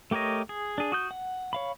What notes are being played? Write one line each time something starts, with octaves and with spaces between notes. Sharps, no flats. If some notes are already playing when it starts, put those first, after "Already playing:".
A3 G4 A#4 C#5 D#5
G#4
D4 G#4
F#4 D#6 G6
F#5
C#5 F5 B5